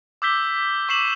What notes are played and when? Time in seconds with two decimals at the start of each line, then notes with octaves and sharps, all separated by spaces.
0.22 D6 E6 G6 B6 G7
0.89 C#6 D6 C7 E7 F#7